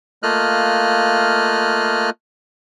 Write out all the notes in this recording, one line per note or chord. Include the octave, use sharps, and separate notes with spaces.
A3 A#3 F4 D#5 F6 F#6